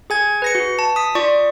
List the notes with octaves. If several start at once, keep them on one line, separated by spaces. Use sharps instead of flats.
G#4 G#5 G#6
B4 A#6 C#7
F#4
A5
D#6 B6
F4 D5 C#6